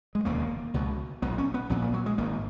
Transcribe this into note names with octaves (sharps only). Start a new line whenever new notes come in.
G#3
E1 D#2 C#3 A#3
C#2 B2
B1 A#2 B3
C#4
B3
A#1 A#2 B3
A#3
F#3
G#3
G#1 G#2 A#3